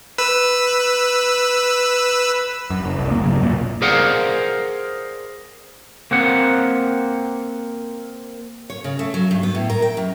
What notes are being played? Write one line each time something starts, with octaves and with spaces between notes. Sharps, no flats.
B4 E6
F#2
F#1
C2
D2 A#3
F1 G2 C#3 F#3
B1 F#2 A#2
G#4 A#4 C5 D5 F5 F#5
A#3 C4 F#5
C#5
C#3
A3
F#3
G2
B3
A2
A#4
G5
F#2